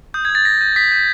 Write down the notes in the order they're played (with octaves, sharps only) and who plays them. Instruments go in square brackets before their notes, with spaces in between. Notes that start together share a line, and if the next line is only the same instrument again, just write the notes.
[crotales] D#6 G6
G6 G#6
A6
D#6 A#6
G6
D#6 B6
G6